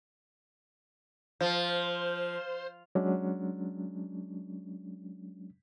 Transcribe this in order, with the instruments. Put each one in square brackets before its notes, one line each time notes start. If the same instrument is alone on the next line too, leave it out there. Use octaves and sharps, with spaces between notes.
[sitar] F3 [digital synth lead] C5
[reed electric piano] F#3 G#3 C#4 D4